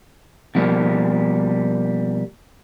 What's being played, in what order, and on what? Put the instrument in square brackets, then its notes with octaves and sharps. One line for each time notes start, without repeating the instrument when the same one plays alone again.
[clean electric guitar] B2 F3 G3 A#3